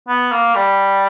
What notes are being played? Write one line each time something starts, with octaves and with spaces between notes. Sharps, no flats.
B3
A#3
G3